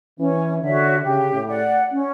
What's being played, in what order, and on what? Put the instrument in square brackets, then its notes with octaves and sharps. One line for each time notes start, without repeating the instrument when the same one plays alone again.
[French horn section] E3 [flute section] C#4
[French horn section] D3 [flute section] F#4 C#5 E5
[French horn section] C#3 [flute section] G4
[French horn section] A2
[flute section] D5 F#5
C#4